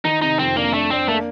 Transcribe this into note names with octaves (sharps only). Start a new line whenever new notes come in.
D#3 D#4
C3 D#4
F2 C4
A#3 D4
A3 D4
C4 D4
A3 A#3